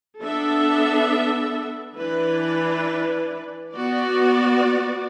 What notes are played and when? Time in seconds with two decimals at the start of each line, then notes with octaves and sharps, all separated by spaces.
0.21 B3 D4 A4 E5
1.97 E3 D4 B4
3.74 B3 F#4 D5